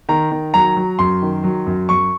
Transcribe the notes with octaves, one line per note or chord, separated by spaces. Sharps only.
D#3 A#5
D#3
F#3 A#5
F#3
F#2 C6
D#3
F#3
F#2
F#2 C#6